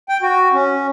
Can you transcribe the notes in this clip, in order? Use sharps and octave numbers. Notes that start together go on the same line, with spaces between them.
G5
F#4
C#4